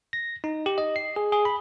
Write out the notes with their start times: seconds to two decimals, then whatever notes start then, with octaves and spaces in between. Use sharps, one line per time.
0.13 A#6
0.44 D#4
0.66 G4
0.78 D#5
0.96 C7
1.16 G#4
1.32 G#4
1.45 B5